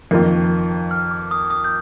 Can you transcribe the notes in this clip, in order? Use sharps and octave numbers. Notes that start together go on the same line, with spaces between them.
F2 D#3 A#3 F4
F6
D6
D#6
D#6
G6